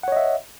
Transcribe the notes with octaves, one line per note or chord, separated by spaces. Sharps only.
C#5 D#5 E5 F#5